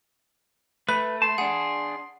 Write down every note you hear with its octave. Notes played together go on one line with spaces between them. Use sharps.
A3 B4 B5
A5 C6
D4 G#4 F#5